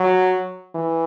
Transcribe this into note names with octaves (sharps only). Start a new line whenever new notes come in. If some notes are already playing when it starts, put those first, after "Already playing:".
Already playing: F#3
E3